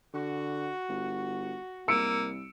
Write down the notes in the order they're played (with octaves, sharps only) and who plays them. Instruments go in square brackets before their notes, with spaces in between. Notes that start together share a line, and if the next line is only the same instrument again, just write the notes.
[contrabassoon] D3 [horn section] F#4
[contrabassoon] G1
[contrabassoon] C2 [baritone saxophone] A#3 [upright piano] E6 C#7 D7